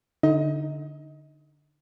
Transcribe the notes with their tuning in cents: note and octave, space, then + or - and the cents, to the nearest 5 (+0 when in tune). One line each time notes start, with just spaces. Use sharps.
D3 +0 D#4 +0 D#5 +30